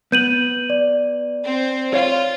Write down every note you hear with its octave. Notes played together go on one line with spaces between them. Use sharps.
B3 G6 D#7 F#7
D5
C4 C5
F4 C#5 F5